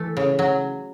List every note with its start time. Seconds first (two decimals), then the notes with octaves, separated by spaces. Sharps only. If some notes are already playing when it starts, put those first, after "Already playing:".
Already playing: E3 A3
0.17 C#3
0.39 F#3